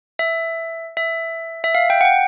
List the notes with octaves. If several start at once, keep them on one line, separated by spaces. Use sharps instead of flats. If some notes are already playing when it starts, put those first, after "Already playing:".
E5
E5
E5
F5
G5
F#5
G5